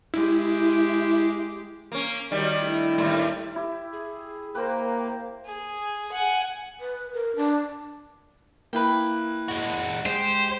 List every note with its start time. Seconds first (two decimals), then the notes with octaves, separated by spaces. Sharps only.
0.14 G#3 E4 G4
1.92 A#3 C#4
2.31 D#3 G3 F#4 C#5 D5
2.60 A3 D4 E4
2.98 D#2 A2 G3
3.56 E4 G4
3.93 G#4
4.55 A#3 B4 C5 G5
5.46 G#4
6.12 F#5 G#5
6.80 B4
7.14 A#4
7.36 D4
8.73 A#3 E4 B4 G5
9.48 G#3 F#4
10.06 G#3 G4 C5